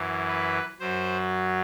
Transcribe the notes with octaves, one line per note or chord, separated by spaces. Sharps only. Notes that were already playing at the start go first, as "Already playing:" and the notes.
Already playing: F#2 E3
B4
F#2 F#3 C5